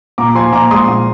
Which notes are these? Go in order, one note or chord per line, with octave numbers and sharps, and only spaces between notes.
A#2 A#5 D6
F3 G#5 C6
A#2 A#5 D6
G#3 C6 D#6
A#2